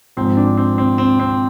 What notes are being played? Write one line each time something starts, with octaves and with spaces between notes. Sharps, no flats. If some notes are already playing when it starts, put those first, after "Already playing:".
G#1 G#2 F3 C4
D4
C4
C4
C4
C4